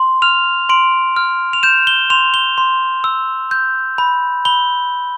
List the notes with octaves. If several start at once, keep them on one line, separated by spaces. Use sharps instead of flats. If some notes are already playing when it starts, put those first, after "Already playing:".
Already playing: C6
F6 F7
C6 D7
F6
F7
G6 E7
G7
C6 F7
G7
C6
E6
G6
B5
B5 G7